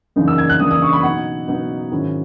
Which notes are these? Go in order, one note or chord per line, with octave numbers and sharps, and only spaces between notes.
F#2 C#3 E3 A#3 D#4
E6
G#6
F#6
F#2 C#3 E3 A#3 D#4 D#6
D#6
C#6
B5
B2 F#3 B3 D#4 F#5
B2 F#3 B3 D#4
G#2 D#3 F#3 C#4 E4